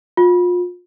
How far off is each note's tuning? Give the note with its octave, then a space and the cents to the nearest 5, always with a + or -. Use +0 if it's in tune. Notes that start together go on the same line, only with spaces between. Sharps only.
F4 +30